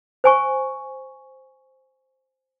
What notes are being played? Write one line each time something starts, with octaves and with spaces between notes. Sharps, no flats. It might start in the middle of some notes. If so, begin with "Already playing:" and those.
C5 G#5 C#6